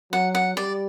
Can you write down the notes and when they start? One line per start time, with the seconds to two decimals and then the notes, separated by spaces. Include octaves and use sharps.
0.13 F#3 F#5
0.35 F#5
0.56 G3 D5